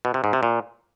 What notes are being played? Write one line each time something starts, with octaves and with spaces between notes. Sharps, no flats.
B2
C3
G#2
C3
A#2